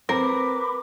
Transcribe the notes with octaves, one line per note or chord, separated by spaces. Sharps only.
C4 A#4 B4 B5 D6